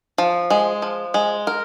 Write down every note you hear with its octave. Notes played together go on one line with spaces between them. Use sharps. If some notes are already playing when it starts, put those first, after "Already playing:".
F3
G#3
F3
G#3
A#4